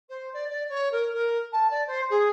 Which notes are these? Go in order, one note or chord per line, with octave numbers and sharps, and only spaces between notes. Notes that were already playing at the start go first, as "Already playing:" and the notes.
C5
D5
D5
C#5
A#4
A#4
A5
D5
C5
G#4